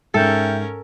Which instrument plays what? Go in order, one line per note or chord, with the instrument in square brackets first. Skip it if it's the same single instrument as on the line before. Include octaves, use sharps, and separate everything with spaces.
[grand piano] G#2 [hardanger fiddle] C#4 A#4 [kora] A4 [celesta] E5 G5 G6